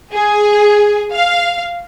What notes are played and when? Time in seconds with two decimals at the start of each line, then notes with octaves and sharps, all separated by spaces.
0.13 G#4
1.13 F5